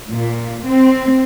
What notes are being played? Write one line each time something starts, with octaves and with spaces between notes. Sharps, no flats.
A#2
C4